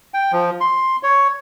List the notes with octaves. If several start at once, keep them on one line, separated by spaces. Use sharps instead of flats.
G5
F3
C6
C#5